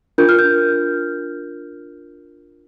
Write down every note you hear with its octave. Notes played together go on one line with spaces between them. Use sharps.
D4 F4 A#4 G6
F6
G6